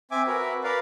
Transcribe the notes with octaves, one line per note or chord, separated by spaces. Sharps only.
C4 E5 G#5 D6
F#4 A#4 B4
A#4 B4 D5 F5